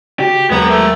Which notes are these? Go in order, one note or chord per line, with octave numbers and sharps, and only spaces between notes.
C#3 F#4 G4
D#2 F#3 G#3 B3 A#4
A3